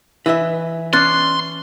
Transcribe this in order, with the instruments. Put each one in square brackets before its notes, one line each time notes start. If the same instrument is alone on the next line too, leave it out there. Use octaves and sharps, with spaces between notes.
[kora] E3 [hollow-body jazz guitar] B4 D#5 E5
[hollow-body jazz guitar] C#4 D4 [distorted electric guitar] C6 [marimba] F#6 A6